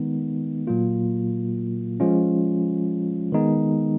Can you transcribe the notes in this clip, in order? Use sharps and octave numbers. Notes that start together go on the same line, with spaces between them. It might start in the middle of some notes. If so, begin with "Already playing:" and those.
Already playing: D#3 G#3 B3 D#4
A#2 F#3 A#3 F4
F3 G#3 C#4 F4
D#3 G#3 B3 D#4